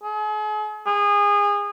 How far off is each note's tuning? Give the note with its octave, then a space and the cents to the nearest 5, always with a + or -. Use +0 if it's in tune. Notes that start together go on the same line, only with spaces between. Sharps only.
G#4 +40
G#4 -25